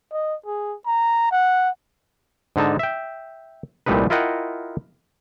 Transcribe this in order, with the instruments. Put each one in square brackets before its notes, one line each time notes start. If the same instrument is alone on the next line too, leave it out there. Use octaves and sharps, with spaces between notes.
[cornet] D#5
G#4
A#5
F#5
[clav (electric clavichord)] G#2 D3 D#4 A5
E5 G5
C2 A#2 G3 A3 D#4 B4
E4 F4 A#4 D#5 F#5 G5